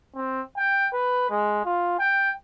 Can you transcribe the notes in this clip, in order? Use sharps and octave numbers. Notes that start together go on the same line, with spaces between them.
C4
G5
B4
G#3
F4
G5